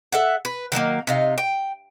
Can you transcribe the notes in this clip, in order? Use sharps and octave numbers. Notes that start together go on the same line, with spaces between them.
A4 E5 F#5
B4
D#3 F#3 G3 A#3
C3 D#4 F5
G5